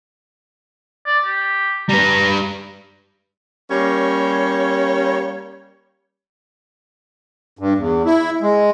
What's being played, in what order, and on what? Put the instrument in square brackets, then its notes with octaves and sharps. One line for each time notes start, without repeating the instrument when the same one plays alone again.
[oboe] D5
G4
[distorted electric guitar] G3 B4 [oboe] A#5
[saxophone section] G3 A#3 C#4 C#5
[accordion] G2
E2
E4
G#3